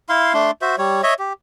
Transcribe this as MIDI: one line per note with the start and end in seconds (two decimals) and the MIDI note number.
0.09 0.33 64
0.09 0.33 77
0.09 0.33 84
0.34 0.51 57
0.34 0.51 62
0.34 0.51 84
0.62 0.76 66
0.62 0.76 72
0.62 0.76 76
0.78 1.01 55
0.78 1.01 73
1.03 1.14 73
1.03 1.14 75
1.03 1.14 76
1.19 1.33 67